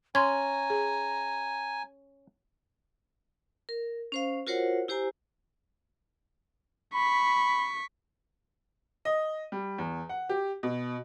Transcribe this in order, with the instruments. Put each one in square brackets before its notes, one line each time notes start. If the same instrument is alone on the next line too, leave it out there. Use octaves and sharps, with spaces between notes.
[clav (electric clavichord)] C#4 [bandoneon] G#5 [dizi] A#5 [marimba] C6 G#6
[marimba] G#4
[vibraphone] A#4
C#4 C5 F5
F4 F#4 A#4 C5 C#5 F#5
E4 G4 C5 G#5 A#5
[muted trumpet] B5 [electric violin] C#6 B6
[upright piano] D#5
G3
E2
F#5
G4
B2